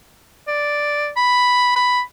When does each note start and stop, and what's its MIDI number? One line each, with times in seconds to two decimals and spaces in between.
0.48 1.09 74
1.16 1.71 83
1.76 2.01 83